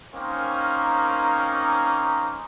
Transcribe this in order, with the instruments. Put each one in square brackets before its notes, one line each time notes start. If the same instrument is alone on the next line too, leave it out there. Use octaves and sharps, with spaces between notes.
[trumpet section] A#3 C4 C#4 D#4 A#4